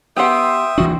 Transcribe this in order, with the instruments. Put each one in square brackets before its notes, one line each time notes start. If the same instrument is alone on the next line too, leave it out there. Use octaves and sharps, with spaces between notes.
[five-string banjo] B3 G4 F#5 [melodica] E5 D#6 [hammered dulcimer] G5 C6
[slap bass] D#2 E3 D4 [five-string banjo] F#4